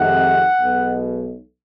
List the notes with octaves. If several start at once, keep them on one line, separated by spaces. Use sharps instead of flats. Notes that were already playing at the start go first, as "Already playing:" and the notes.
Already playing: F2 C3 D#3 G#3 F#5
B1 B2 G#3